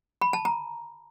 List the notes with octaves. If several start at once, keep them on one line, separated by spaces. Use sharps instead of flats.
B5
A5
A#5